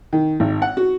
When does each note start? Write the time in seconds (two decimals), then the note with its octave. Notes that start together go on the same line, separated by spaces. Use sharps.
0.13 D#3
0.40 G#1
0.62 F#5
0.77 F#4